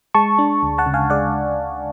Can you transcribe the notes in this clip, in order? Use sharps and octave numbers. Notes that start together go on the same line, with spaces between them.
G#3 A5 C#6
D4
D2
F#5 A5
C#3
F5 G#5
G#3 D5 F#5